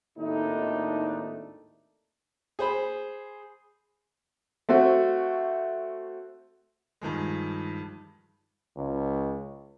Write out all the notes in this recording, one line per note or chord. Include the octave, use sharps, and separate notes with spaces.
G#1 D#2 A2 A3 D4 D#4
G#4 C5 B5
A3 C4 F#4
G2 D#3 F3 G#3
C#2